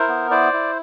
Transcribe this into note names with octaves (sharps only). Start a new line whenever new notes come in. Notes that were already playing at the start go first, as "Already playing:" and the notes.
Already playing: E4 A#4 C5
B3
E4 C5 D5
E4